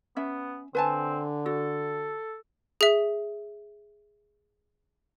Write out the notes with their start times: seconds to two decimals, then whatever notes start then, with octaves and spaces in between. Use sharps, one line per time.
0.16 B3 C#4 E5
0.75 D3 C4 B4 G#5 A5
1.46 F#4 A4
2.81 G#4 E5